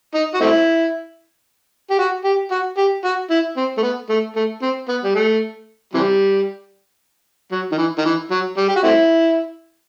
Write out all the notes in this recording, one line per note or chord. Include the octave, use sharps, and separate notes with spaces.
D#4
F#4
A3 C4 E4
G4
F#4
G4
F#4
G4
F#4
E4
C4
A3
B3
A3
A3
C4
B3
G3
A3
C3 E3 G3
F#3
D#3
E3
D#3
E3
F#3
G3
G4
F#4
A3 C4 E4